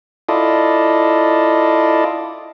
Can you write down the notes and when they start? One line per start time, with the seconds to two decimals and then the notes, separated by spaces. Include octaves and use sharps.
0.29 E4 F4 A4 D5 D#5